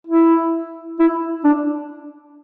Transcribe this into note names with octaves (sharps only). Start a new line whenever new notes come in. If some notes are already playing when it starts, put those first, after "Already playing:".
E4
E4
D4